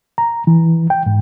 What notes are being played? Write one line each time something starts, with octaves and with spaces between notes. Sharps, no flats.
A#5
E3
G5
G#2